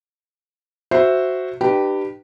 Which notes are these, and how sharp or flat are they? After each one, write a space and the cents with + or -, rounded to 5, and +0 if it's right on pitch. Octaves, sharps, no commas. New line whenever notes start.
F#4 +0 C5 +0 E5 +0
D4 +45 G4 -10 B4 +5